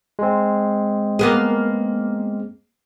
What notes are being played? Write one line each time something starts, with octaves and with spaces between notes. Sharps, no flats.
G#3 C4
A#3 B3 G#4